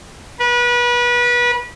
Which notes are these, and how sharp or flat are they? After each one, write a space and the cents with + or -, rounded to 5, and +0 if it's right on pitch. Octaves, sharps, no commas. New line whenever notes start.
B4 -30